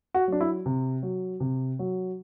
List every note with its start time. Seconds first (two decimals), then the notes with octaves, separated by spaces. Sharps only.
0.14 F#4
0.28 F#3 D4
0.41 E4
0.66 C3
1.03 F#3
1.40 C3
1.79 F#3